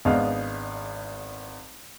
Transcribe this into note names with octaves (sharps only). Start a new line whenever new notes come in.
G#1 B3 D4 G#4 D#5 F5